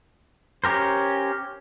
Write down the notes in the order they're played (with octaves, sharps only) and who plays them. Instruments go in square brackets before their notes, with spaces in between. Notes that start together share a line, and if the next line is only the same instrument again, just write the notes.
[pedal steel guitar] C#4 G4 A#4 C5